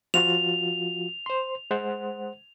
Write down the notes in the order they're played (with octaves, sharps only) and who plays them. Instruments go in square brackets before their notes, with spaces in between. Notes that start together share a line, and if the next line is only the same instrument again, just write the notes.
[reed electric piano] F3 F4 F#4 [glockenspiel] F7
[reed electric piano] C5 C6
G#3 C5 F#5